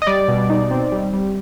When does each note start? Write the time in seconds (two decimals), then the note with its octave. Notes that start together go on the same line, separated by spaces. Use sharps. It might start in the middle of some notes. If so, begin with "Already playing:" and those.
0.02 D#5
0.07 G3 D5
0.28 B2
0.50 D#4
0.71 C4
0.92 G3
1.13 G3